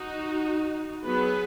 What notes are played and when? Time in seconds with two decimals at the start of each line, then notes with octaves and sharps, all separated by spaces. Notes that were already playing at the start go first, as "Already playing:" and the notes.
Already playing: D#4 F#4
1.04 F#3 B3 G#4 B4